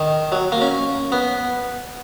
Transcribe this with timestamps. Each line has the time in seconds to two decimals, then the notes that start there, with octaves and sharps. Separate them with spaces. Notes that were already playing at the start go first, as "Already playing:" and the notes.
Already playing: D#3
0.32 F#3
0.52 A#3
0.62 C#4
1.12 B3